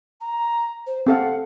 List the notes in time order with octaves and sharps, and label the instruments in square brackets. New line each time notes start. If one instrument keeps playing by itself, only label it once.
[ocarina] A#5
C5
[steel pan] C4 A4 F5 [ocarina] F#5